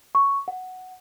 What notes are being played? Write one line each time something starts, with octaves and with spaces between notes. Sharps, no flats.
C#6
F#5